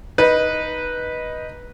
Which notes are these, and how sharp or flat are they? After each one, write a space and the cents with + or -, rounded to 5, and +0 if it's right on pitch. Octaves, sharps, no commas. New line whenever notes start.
D#4 +0 B4 -10